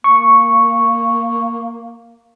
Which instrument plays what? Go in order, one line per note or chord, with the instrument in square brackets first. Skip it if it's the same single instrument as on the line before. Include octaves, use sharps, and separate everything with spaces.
[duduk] A#3 [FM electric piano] C#6